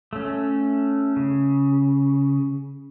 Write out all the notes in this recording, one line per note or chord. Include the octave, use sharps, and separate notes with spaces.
A3 C#4
C#3